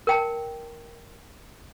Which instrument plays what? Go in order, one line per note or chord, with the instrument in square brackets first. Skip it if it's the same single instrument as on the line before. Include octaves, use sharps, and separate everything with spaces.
[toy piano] A#4 G5 A5